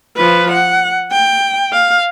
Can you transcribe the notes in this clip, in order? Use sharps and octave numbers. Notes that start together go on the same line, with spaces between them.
F3 B4
F#5
G5
F5